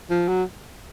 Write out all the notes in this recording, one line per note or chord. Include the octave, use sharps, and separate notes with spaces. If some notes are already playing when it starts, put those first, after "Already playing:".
F3
F#3